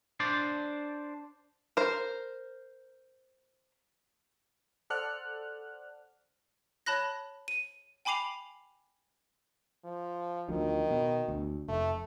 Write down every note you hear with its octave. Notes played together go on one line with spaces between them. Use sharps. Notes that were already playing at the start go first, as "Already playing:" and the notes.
D4 C5 D5
A#4 C5
A4 C5 D5 F#5 F6 F#6
C#5 A5 B5 F#6 A#6
D#7
G5 G#5 B5 D6 C7 F7
F3
D2 D#3 F3
B2
D2
F1 A3